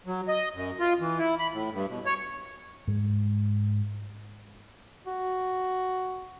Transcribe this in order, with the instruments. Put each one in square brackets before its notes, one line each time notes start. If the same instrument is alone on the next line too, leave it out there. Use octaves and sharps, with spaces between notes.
[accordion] F#3
D#5
F#2
F4
E3
E4
B5
A2
G2
B2
C#5
[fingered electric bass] G#2 G#3
[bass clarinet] F#4